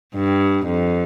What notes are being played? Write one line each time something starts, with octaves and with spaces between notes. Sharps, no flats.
G2
F2